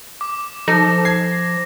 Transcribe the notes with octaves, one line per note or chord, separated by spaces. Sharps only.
D6
F3 D#4 A4 A#6
G#6 C7